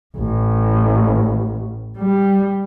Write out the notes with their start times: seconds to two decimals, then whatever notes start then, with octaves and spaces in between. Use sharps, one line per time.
0.17 A1
1.98 G3